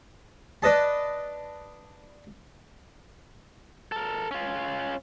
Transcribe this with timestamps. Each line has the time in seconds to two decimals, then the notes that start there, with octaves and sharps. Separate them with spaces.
0.62 D4 B4 D#5 A5
3.92 A4 A#4
4.31 C#4 F4